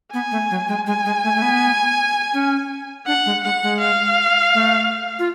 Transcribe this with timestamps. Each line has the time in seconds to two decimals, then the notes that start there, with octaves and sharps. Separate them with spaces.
0.13 B3 G#5
0.31 A3
0.51 F#3
0.68 G#3
0.87 G#3 G#5
1.05 G#3
1.24 A3
1.35 A3
1.42 B3
2.34 C#4
3.07 D4 F#5
3.26 G#3
3.44 G#3 F#5
3.63 G#3
3.81 F5
4.54 A3
5.19 F4